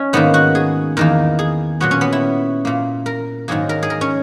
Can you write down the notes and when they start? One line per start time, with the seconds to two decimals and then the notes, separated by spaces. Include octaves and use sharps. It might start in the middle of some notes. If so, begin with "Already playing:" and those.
Already playing: C#4 D#4
0.13 G#2 D#3 A#3 B3
0.34 F#4
0.55 G#4
0.97 E2 D#3 A#3 A#4
1.39 G#4
1.80 A#2 F#3 B3 F#4
1.91 C#4
2.01 B3
2.13 E4
2.65 A#2 A#3
3.06 A#4
3.48 G#2 D#3 F#3 A#3 G#4
3.69 A#4
3.83 G#4
3.90 A#4
4.01 C#4